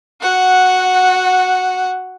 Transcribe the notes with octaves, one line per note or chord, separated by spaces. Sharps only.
F#4 F#5